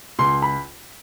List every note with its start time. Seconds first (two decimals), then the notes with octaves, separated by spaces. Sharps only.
0.19 C#2 C6
0.42 B5